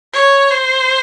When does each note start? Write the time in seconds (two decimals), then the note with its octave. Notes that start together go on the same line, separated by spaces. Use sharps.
0.14 C#5
0.51 C5